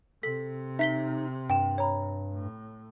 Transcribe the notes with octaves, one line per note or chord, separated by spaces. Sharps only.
C3 A4 B6
D#4 E5 B6 G7
G2 G5 E7
C#5 A#5 B5
A2